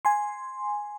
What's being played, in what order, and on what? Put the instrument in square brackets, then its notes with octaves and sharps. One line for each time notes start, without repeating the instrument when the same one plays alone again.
[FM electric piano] G#5 C6